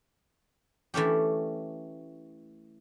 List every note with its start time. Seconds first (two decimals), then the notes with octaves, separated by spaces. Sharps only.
0.94 E3 A3 C#4 G4